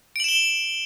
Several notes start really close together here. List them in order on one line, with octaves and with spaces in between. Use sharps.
D7 F#7 E7 G7